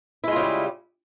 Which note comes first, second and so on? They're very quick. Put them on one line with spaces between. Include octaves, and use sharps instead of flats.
E4 G#3 F4 C#3 G3